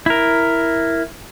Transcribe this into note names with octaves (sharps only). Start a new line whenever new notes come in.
E4 A#4